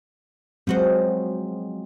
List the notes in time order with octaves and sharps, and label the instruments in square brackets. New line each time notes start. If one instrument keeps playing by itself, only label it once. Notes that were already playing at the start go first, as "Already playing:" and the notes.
[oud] F3 F#4 C5 [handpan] F#3 G#3 C4